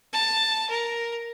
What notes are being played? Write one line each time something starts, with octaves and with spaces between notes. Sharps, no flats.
A5
A#4